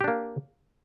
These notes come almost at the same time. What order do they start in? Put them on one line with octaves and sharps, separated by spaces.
G4 D4 A#3